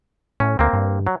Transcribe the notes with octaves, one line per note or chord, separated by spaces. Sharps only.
A2 C#4
D2 A#3 C4
G2
F#3